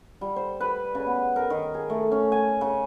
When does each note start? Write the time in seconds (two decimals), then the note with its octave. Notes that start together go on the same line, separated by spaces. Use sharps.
0.21 G3
0.36 C5
0.60 B4
0.95 C#3
1.07 B3
1.36 A#4
1.50 D#3
1.74 G#4
1.90 A3
2.11 C#4
2.32 G#5
2.61 C#3